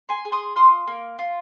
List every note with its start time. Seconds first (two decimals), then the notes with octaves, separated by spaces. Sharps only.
0.09 G#5 C6
0.25 G#4
0.32 C6 D#6
0.56 F4 C6 D#6
0.87 A#3
1.19 F4